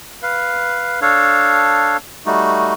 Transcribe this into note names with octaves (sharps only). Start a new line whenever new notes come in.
B4 F5
D4 A4 C#5 F5
G3 A3 D#4 F#4